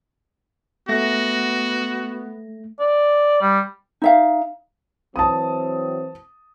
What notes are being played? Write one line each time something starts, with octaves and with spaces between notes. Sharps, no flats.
A3 B3 F#4 A#6
D5
G3
D#4 E5 F5
E3 F#3 C4 A5 D#6